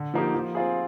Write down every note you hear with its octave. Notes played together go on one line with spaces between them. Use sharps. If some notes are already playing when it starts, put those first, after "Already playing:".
Already playing: D3
F3 A#3 D#4 G4
F3
C4 F4 G#4